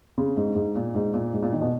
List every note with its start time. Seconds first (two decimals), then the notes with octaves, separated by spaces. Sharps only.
0.18 C#3
0.37 G#2
0.55 G#2
0.75 A#2
0.95 G#2
1.14 A#2
1.33 G#2
1.43 A#2
1.52 D#3
1.61 B2